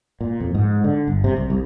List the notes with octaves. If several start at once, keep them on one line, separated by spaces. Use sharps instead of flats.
A#2
F2
G#2
D3
G1
C3
C2
C2